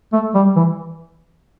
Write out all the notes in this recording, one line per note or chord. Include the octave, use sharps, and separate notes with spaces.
A3
G3
E3